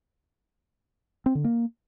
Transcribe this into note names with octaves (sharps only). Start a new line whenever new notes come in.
C4
D3
A#3